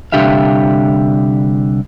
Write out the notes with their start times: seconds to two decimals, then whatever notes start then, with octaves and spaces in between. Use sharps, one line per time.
0.12 C2 D3 D4 G4 E5 F5